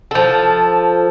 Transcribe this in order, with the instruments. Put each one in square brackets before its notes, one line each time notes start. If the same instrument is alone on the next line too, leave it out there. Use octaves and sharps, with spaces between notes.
[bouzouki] F3 A4